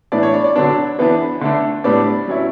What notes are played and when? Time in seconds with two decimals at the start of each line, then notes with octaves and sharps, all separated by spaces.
0.12 A2 E3 B3 D4 D5
0.23 C#5
0.34 D5
0.44 D5
0.56 D3 F#3 B3 D4
0.99 E3 B3 D4
1.41 D3 A3 D4
1.84 A2 G3 B3 D4 D5
2.27 F#3 C#4 E4